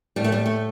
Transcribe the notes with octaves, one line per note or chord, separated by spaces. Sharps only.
A2 G3
A3
G3
A3